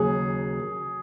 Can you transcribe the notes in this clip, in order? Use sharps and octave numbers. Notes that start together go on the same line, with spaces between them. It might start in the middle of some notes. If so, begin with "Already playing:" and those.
Already playing: D#2 C#3 F#3 G#4